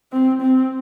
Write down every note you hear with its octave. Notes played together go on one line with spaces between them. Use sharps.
C4
C4